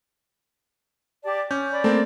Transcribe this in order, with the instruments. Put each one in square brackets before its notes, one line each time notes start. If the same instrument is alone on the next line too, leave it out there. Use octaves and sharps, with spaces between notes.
[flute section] G4 D5 A5
[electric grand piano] C#4 [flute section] D6 [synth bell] G6
[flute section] D5 B5
[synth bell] A3 A4 [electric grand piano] A#3 C4